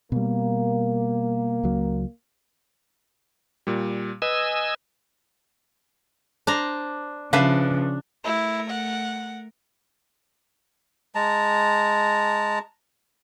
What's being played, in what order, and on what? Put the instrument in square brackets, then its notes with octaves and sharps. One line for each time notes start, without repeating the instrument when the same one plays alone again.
[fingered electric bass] B2 G3 [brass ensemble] A#3
[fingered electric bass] C#2 F#3
[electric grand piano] A#2 G3
[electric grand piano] B4 [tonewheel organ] D#5 G#5 E6
[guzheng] D4 C5 A#5
[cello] C#3 F3 [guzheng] D4 [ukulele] B4 E5 F5
[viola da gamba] A3 A#4 [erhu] E4
[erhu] F#5
[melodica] G#3 A5 A#5